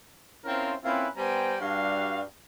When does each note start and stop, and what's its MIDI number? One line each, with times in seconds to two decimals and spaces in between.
0.44 0.74 60
0.44 0.74 61
0.44 0.74 64
0.44 0.74 65
0.44 0.74 70
0.44 0.74 72
0.84 1.07 58
0.84 1.07 60
0.84 1.07 61
0.84 1.07 64
0.84 1.07 65
0.84 1.07 71
1.16 1.55 55
1.16 1.55 59
1.16 1.55 72
1.16 1.55 79
1.16 1.55 80
1.16 1.55 82
1.60 2.21 43
1.60 2.21 55
1.60 2.21 62
1.60 2.21 66
1.60 2.21 77